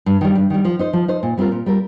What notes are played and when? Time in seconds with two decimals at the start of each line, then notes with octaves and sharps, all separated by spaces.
0.06 G2
0.21 D#3 G3
0.35 G2
0.50 D#3 G3
0.65 F3
0.79 D#4 C5
0.93 F3
1.08 D#4 C5
1.23 A#2
1.37 G3 C4 F4 A#4
1.52 A#2
1.66 G3 C4 F4 A#4